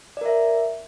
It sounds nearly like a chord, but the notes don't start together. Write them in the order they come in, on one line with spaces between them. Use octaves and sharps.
D5 A#4 E5